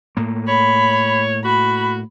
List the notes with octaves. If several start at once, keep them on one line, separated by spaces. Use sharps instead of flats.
A2 A#3
C#5 B5
F#4 B5